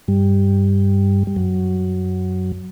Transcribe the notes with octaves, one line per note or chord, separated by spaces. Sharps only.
G2 G3
G3
F#2 F#3